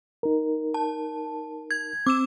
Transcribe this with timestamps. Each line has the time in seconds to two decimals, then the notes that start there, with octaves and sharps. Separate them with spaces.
0.23 D#4 A#4
0.74 A5
1.71 G#6
2.07 C4 D6 E6 E7